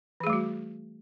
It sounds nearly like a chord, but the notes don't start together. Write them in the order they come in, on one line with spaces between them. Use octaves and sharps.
E3 G#4 A3 G3 F#4